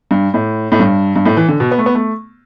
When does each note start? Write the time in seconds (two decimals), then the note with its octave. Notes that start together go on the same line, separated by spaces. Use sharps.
0.11 G2
0.34 A2
0.72 A2
0.80 G2
1.16 G2
1.26 A2
1.37 E3
1.48 D3
1.60 B2
1.71 B3
1.78 A3
1.86 B3
1.95 A3